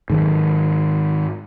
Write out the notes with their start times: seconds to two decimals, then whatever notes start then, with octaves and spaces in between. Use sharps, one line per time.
0.10 G#2 D#3 F#3